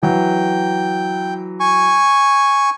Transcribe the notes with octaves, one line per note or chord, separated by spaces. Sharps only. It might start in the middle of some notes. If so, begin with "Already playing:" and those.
E3 F#3 G5
G#5 C#6